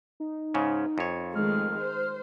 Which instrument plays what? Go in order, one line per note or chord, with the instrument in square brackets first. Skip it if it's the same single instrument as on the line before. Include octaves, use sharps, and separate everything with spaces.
[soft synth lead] D#4
[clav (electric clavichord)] G#2 C#3 C#4
F2 C#5
[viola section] D#3 G#3 A3 [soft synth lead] F6
[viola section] C5